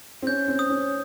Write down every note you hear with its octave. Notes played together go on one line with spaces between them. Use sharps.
C4
C#4 G6
C4
D#6
C#4